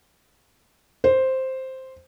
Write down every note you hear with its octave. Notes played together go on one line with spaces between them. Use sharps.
C5